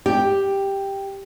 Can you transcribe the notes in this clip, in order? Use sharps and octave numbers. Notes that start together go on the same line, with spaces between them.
G4